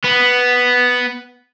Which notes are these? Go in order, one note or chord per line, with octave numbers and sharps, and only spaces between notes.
B3